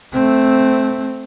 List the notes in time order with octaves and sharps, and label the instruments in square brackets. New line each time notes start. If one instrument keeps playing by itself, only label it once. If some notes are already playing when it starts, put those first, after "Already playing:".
[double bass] A3 C4